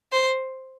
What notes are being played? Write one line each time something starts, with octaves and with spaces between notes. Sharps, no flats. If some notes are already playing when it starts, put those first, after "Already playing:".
C5